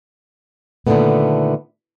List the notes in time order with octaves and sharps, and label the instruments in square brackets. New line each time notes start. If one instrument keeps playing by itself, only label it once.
[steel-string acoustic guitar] A#2 D3 D#3 F3 A3 B3